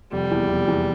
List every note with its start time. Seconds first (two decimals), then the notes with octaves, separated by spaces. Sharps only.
0.12 F1 G3
0.31 E2 E3
0.49 F1
0.68 E2 E3